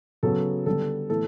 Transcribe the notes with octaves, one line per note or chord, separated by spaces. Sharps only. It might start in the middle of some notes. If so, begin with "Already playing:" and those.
C#3 F#3 B3 A4
D3 G3 B3 A4
A2 E3 B3 A4